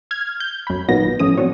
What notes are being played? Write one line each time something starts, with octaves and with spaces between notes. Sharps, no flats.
F6 G#6
G6
F#2 B5
A1 A#2 D#3 F#3 B3 A#6
A2 E3 F3 C#4 D#6
C4 D4 F#4 C#5